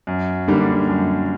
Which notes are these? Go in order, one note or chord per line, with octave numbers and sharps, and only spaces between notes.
F#2
D3 G3 A#3 D4
F#2